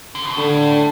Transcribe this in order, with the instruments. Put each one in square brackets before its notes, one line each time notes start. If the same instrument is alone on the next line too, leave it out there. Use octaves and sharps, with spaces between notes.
[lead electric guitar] D3
B2
[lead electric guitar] A2 [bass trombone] D3